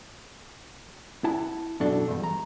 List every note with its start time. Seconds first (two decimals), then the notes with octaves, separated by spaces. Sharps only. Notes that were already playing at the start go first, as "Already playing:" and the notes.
1.24 E4 F#5 A5
1.80 F#2 B2 D4 F#4 A4
2.08 E2 G2
2.24 A#5